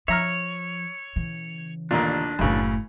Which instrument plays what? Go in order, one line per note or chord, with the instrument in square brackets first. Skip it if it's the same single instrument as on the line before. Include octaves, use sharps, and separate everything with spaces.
[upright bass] F3 [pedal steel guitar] C#5 [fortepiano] E5 A#5 F6
[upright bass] C#3 E3
[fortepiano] A1 D#2 A#2 [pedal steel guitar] D4
[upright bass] F#1 A2 [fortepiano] F#2 C#3 E3